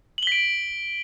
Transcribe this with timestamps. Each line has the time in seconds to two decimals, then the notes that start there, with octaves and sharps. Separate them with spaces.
0.18 F#7
0.23 G7
0.27 B6
0.32 D7